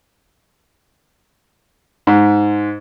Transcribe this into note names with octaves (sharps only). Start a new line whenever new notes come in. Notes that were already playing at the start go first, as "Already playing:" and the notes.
G#2